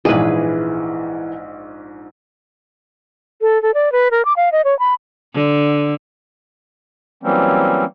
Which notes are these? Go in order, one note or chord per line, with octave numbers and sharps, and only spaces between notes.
A#1 G#2 E3 G#4 B4
A4
A4
D5
B4
A#4
D6
F5
D#5
C#5
B5
D3
E3 F#3 G3 A#3 C4 C#4